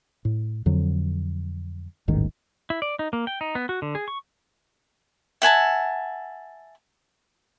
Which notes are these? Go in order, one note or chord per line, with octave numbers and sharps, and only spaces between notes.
A2
F2 D3 F#3
D#1 A1 G#2 D#3
E4
D5
D#4
A#3
G5
D#4
B3
F#4
D3
G#4
C#6
E5 F#5 G#5 A5